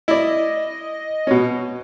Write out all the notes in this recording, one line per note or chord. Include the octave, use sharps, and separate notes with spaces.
E4 D5 D#5
B2 C#4